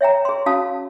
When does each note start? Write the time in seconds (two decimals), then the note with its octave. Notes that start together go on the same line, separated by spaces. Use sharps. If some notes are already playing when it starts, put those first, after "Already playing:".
0.01 C#5 E5 G5 A#5
0.25 G#4 C6
0.46 C#4 F#4 F5 A5 D#6